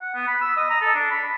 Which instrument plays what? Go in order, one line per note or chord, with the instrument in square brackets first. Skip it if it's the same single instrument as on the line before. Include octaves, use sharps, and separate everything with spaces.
[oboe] F#5
B3
B5
E6
D#5
A#5
A4
D4
B5